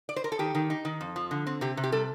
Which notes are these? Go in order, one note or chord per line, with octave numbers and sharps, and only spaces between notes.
D5
C5
A#4
A4
D#3 G4
D#3
D#4
D#3
F2
F3
D3
C4
C3 G4
C3
G4
G3 A4